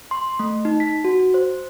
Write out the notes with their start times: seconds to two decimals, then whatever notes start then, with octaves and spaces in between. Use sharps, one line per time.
0.11 C6
0.39 A3
0.65 D#4
0.80 B6
1.05 F#4
1.34 C5